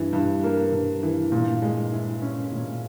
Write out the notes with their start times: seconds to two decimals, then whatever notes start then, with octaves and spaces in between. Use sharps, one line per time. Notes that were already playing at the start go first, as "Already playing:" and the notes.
Already playing: G2 E3
0.13 G2
0.44 A#3
0.73 G2
1.03 E3
1.32 A#2
1.62 G#3
1.93 E4
2.22 C#4
2.52 A#2